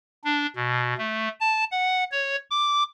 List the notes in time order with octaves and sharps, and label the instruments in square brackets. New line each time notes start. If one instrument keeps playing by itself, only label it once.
[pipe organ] D4
B2
A3
A5
F#5
C#5
D6